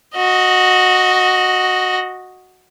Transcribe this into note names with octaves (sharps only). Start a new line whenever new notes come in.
F#4 D#5